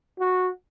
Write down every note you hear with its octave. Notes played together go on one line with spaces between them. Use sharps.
F#4